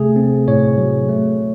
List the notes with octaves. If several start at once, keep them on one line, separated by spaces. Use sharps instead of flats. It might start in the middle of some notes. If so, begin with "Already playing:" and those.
Already playing: C3 A3 G#4
C4
A2 C#5
F#3
A3